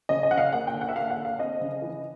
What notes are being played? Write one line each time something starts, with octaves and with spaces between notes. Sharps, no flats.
C#3 D#5
D#5
C#3 F#5
F5
A#3 F#5
G5
D3
F#5
E5
A#3 F5
F#5
D3
F5
C4 D#5
C#3
E3